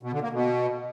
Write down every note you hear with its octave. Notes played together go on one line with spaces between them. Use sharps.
B2
D3
A#3
B2